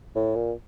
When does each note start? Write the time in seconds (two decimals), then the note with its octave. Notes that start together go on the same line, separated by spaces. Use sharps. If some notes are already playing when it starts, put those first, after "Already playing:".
0.15 A2
0.35 A#2